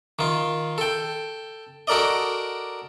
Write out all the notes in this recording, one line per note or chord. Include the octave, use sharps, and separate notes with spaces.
D#3 F4
A4 G5
F#4 A4 A#4 D5 D#5